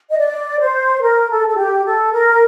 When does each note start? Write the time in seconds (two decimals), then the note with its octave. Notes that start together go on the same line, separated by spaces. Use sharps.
0.11 D#5
0.18 D5
0.60 C5
1.02 A#4
1.30 A4
1.48 A4
1.57 G4
1.85 A4
2.13 A#4